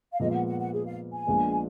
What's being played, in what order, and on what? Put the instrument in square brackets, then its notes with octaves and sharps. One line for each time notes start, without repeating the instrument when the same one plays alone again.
[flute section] F5
[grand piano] A#2 F3 G#3 B3 [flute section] D#5
[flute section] F5
F#5
F#5
F#5
G#4
F5
G#5
[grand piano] A#1 A#2 G#3 B3 D4